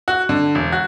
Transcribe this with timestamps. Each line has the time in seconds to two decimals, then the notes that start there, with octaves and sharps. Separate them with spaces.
0.08 F#4
0.29 D3
0.55 E1
0.72 F#4